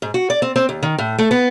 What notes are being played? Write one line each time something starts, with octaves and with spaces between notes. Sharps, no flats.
G#2
F#4
D5
C4
C4
D#2
D#3
A2
A3
B3